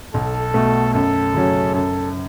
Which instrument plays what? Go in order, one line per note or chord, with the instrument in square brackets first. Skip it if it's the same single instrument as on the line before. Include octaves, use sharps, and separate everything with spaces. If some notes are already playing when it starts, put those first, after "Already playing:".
[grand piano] B1 [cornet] A4
[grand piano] B2 A3
[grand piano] F#2 [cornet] A4
[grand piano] C#3 F#3 C#4
[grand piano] F#2 [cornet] A4